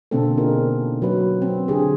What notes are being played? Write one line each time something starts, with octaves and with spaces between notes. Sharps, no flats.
B2 D3 A#3 C4 D4 A4
D4 D#4 F4 G#4 A#4
F#3 B4
C4
D3 G4 G#4